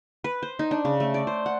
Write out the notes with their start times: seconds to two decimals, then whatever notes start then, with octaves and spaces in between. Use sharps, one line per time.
0.24 B4
0.43 C5
0.59 D#4
0.71 D4
0.85 C#3
1.00 A3
1.14 D5
1.27 C5
1.46 F#5